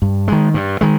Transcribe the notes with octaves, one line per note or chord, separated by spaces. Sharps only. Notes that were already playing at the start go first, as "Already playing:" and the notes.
G2
D#3 G#3
G2
D#3 G#3